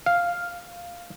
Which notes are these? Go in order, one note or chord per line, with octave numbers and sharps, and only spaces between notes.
F5